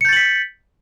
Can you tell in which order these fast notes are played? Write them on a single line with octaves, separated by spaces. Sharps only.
C#7 G6 A6 F#7 B6